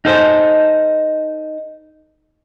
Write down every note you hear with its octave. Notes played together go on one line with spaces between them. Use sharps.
D#4 A4 C5